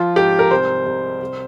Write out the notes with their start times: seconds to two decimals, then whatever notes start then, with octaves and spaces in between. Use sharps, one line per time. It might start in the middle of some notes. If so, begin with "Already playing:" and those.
Already playing: F3 F4
0.16 G#2 G4
0.39 A#4
0.51 C2 C5
0.86 C2
1.21 C2